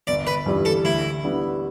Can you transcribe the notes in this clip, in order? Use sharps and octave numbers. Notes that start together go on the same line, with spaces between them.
G1 D5
B4
G2 E3 G3 E4
A4
D2 E4
D3 G3 B3 E4